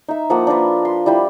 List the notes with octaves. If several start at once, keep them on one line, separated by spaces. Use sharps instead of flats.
D#4 E5
F3 A#3 F#5
D4 F4 A#4 B4
C6
G3 E4 G5 B5